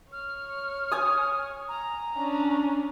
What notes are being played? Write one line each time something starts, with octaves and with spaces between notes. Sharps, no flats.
C#5 F6
G#5 D#6
A#5
C#4 D4